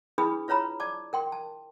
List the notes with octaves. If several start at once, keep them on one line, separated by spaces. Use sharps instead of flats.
D4 E4 G#4 B4 B5 D#6
F4 B4 C#5 A#5 B5
D5 A5 D6
A#4 G5 C6
A5